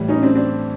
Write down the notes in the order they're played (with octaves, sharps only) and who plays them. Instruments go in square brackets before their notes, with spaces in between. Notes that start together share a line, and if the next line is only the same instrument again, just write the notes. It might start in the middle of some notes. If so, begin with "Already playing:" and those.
Already playing: [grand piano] A2 E3 G3
[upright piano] C#4 D#4
C4 D4
C4 D4